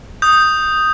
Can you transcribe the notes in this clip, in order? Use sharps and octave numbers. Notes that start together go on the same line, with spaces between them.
D#6 G6